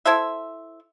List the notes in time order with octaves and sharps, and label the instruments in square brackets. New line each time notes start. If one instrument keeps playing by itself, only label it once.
[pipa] E4 A4 C5 E5